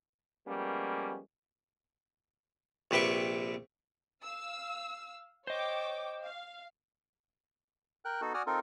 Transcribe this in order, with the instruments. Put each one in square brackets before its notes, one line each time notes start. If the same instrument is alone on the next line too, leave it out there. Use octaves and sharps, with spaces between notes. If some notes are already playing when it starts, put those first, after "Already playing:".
[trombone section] F3 G3 G#3 A#3 B3 C#4
[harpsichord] A#1 C3 B4 G5 C#6
[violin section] F5 E6
[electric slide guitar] C5 D#5 [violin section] C#5 G5 D6
[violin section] F5
[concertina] A#4 G5 F#6
B3 D#4 F#4 A4
F#4 D5 F#5 G#5 D#6 F6
C4 D#4 F4 A4 A#4